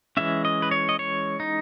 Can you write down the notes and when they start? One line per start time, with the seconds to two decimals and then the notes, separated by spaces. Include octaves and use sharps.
0.17 E3 G#3 C#4 E5
0.45 D#5
0.62 B4
0.71 C#5
0.89 D#5
0.99 C#5
1.40 D#4